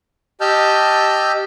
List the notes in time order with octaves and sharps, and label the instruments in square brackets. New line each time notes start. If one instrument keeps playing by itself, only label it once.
[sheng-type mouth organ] G4 D#5 A5 E6 F6 G6